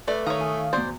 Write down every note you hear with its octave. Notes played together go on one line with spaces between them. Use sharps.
A3 B4 D5
D#3 C#5 F5 A#5 D#6
G#5
E2 B2 C5 D5